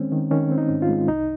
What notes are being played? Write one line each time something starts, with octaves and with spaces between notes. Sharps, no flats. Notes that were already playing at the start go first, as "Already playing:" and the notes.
Already playing: D#3 G#3 C4 C#4
D#3
D#3 C#4
C4
D#4
G#2
F4
G#3
C2 D#4